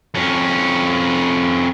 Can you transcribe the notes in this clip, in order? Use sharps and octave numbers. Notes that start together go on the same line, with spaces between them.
F2 C#4